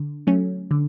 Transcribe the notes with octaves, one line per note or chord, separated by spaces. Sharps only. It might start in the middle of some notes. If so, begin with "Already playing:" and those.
Already playing: D3
F#3 A3 C#4
D3